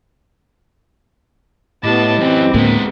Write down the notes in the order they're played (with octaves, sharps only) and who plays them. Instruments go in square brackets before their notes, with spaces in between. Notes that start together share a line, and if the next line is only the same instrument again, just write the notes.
[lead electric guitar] A2 [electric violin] B3 A5 [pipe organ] E4 G4 D#5
[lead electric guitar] F#2 E3 [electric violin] C4
[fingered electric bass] D2 A2 A#3 [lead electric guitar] G#3 B3